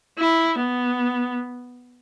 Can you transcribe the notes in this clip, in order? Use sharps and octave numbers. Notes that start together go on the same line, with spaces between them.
E4
B3